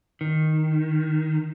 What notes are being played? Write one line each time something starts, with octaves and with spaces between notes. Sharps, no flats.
D#3